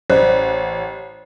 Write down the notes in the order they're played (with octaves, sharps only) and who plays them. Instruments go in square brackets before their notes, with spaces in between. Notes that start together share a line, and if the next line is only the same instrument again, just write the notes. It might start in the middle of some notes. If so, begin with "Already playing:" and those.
[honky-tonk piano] A1 [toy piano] C5 D5